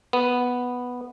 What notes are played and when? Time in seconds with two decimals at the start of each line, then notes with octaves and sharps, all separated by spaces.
0.13 B3